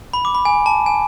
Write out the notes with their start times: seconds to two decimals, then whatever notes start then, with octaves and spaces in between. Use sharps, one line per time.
0.13 B5
0.25 D6
0.35 B5
0.45 G#5
0.66 A5
0.86 G#5